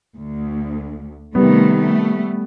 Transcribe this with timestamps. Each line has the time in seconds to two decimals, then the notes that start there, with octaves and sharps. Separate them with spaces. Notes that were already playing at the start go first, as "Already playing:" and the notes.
0.17 D2
1.35 C3 D#3 G3 A3 B3
1.81 A3